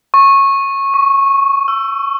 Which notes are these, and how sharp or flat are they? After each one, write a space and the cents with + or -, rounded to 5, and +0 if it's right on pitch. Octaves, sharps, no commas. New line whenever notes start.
C#6 -15
C#6 +25
E6 +25